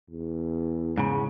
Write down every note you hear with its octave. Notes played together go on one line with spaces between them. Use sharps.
E2
G#2 C#3